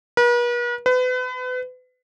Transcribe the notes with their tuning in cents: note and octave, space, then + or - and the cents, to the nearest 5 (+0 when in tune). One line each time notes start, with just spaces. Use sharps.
B4 -45
B4 +35